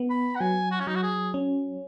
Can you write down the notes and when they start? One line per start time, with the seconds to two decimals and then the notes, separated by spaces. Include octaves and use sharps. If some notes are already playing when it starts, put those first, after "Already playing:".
Already playing: B3
0.10 B5
0.35 F#5
0.40 F#3 G#5
0.71 F#4
0.80 C#4
0.87 F#3 D#4
0.95 F#4
1.03 G#4
1.34 C#4